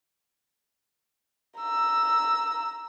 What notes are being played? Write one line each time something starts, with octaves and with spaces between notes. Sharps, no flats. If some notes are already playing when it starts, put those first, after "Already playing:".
A#5 E6